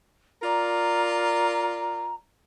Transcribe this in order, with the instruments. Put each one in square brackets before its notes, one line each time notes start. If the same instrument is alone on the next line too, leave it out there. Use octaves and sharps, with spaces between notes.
[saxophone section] F4 A#4 D5 [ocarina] A#5